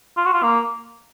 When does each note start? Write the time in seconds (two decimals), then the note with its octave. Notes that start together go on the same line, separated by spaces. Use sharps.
0.17 F4
0.26 F#4
0.33 F4
0.43 A#3